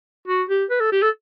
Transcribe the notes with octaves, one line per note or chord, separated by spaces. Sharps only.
F#4
G4
B4
A4
G4
A4